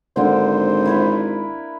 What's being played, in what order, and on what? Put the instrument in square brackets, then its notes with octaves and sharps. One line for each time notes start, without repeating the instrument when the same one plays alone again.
[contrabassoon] G#1 [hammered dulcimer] D3 A#3 C4 [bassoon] C5
[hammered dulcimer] E4 A#4 B4